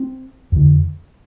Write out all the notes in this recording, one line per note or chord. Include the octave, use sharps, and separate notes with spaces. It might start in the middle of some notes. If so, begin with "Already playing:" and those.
Already playing: C4
F2 D3